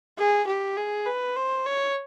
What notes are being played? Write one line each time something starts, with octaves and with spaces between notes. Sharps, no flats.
G#4
G4
G#4
B4
C5
C#5